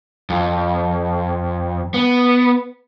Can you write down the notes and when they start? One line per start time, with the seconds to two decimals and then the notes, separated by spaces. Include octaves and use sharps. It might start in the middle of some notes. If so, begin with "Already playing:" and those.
0.30 F2
1.94 B3